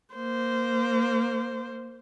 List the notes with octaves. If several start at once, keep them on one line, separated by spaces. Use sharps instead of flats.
A#3 C5